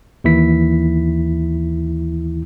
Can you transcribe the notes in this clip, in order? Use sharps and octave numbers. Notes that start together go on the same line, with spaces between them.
D#2 E3 E4 B6